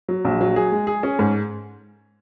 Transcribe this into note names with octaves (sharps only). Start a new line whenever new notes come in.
F#3
A#1
F#3
G#4
G#3
G#4
C#4
G#2